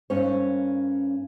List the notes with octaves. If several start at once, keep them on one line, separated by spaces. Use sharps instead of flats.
G2 A#3 C#4 D#4 C5 C#5